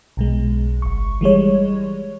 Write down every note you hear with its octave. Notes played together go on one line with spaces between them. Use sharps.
B1 B2 G#3
G1 C#6
E3 G3 G#3 C#5